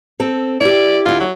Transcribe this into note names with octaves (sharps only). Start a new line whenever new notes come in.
C4 A4
E4 G4 D5
D2 E4 F4
F#3